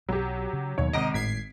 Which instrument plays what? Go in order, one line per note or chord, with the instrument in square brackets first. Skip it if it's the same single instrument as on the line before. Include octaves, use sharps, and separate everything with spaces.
[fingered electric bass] B1 [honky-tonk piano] F#3 G4
[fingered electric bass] C#3
[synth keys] D#2 [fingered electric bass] B2 F#3 B3 [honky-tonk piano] C#5
[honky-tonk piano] G#1 A#5 D7 [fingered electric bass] C3 D#3 G#3 [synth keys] D#5
[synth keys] G#1 G#6 C7 [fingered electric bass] A2 [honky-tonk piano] B6